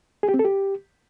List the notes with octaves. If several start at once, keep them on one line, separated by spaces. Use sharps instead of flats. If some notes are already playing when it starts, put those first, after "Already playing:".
G#4
G4
C4
A4
G4